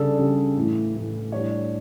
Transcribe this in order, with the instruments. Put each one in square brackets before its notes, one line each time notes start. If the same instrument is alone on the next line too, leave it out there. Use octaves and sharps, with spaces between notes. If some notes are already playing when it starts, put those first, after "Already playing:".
Already playing: [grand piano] C#3 G3 D4 A4
C#3 G3 D4
A2 E3 A3
A2 E3 A3
A2 G3 D4 C#5